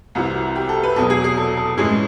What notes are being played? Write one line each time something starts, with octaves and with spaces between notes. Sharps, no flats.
C2 C3 E3 F#4
G4
A4
B4
E2 B2 F#3 A4
G#4
G#4
A4
A4
A2 E3 G#3 C#4 G#4